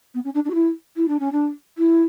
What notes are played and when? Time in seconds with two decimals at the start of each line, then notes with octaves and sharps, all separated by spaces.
0.14 B3
0.24 C#4
0.34 D4
0.45 D4
0.50 F#4
0.54 E4
0.96 E4
1.08 D4
1.19 C#4
1.32 D4
1.78 E4